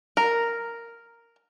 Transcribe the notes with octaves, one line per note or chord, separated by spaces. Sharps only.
A#4